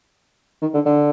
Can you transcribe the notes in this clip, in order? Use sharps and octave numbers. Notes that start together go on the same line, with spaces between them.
D#3
D3
D3